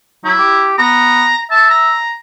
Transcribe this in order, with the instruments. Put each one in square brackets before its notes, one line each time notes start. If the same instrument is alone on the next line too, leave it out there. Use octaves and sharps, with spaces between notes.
[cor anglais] F#3 [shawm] E4
[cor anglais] G4
[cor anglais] B3 [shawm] A#5
[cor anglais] E5 [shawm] A5
[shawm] A#5